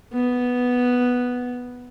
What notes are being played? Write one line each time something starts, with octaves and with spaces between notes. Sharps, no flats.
B3